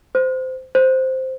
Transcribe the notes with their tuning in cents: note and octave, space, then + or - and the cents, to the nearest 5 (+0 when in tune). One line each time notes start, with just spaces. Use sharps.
C5 -20
C5 +0